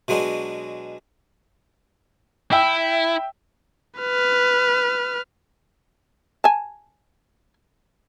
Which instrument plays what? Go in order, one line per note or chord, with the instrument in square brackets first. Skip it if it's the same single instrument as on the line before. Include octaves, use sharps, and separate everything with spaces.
[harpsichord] B2 F#3 G#3 D4
[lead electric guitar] E4 [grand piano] E5 G5 E6
[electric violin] B4 F6
[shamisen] G#5 A5